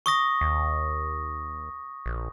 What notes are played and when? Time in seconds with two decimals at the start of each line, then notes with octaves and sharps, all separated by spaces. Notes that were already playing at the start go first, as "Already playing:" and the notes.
0.06 C#6 D#6 A#6
0.41 D#2
2.06 A#1